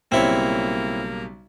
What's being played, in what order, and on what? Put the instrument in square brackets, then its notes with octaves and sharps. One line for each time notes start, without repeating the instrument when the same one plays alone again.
[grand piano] B1 C#3 G3 [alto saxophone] A#3 [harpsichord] C4 E4 C#5